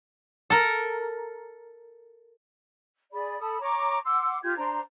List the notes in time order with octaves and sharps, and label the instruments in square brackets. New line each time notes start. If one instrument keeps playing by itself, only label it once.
[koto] A4 A#4
[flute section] G#4 D5 B5
A4 A5 B5 D#6
C#5 A#5 C#6 D6
F#5 C6 D6 E6
F4 G4 G6 G#6
D4 C5 A#5 C6